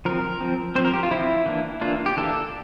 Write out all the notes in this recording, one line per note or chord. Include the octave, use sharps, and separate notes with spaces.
F3 C4 A#4
F3 C4
F3 C4 C5
A#4
G4
F4
F3 C4 E4
E3 A#3 D4
E3 A#3 D4 F4
G4
E3 A#3 D4 A4